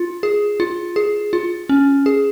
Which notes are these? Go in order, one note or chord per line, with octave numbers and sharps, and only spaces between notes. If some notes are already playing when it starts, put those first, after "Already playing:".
Already playing: F4
G#4
F4
G#4
F4
C#4
G#4